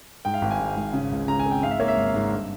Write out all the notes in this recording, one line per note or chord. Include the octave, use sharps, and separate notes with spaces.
G#2 G5
F5
G#1 G5
G#5
G#2
G#1
C#3
C#2
C#3 A#5
G#5
C4
G5
G#2 F5
E5
A#3 C#5
E5
G#1
G#2
G2